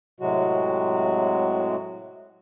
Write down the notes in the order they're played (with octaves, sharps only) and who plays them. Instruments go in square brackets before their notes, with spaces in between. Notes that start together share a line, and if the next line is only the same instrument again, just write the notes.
[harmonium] A2 C3 F#3 G#3 F#4